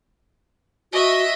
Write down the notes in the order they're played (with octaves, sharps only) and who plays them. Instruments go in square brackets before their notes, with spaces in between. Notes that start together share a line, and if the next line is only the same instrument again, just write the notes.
[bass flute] F#4 [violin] D#5 E5